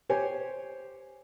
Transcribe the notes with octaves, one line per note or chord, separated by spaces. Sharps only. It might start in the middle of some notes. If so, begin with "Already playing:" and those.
G4 C5 C#5 G#5